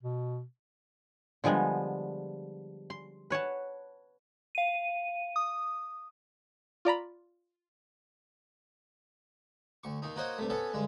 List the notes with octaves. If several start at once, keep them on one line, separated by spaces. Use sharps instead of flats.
B2
D3 F3 G3 G#3 B3
C6
B4 C#5 F#5 A5
F5 D#7
D#6
F4 D5 A#5 B5
D2 C#6
D#2 D#3 D#4
A#3 D#4 F#4 C5 C#5 D#5
G2 C3 A3
B3 C#4 A4 C#5
G2 D3 G#3